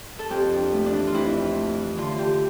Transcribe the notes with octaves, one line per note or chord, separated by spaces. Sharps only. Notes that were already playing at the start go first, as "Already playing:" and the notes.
A4
F2 G4
D4
A3
D4
E3
F4
F2 E4
D4
A3
E3
D3 F4
D3 G4